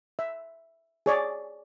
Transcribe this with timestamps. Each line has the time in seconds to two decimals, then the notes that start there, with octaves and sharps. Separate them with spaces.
0.19 E5
1.06 G#4 C#5 D5